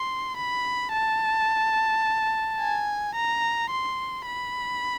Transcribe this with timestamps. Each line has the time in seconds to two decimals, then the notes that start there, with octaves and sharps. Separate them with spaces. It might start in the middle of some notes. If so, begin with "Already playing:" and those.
Already playing: C6
0.37 B5
0.92 A5
2.60 G#5
3.15 A#5
3.71 C6
4.26 B5